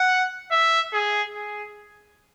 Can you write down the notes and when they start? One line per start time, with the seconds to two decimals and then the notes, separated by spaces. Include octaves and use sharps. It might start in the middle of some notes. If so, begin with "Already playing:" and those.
Already playing: F#5
0.52 E5
0.93 G#4
1.35 G#4